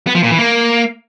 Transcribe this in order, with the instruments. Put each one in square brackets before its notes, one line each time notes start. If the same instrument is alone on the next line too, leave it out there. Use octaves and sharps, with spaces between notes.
[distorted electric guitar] B3
F3
A#2
E3
A#3